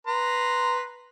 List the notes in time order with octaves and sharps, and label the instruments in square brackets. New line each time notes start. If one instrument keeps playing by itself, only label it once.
[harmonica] B4 A#5 C6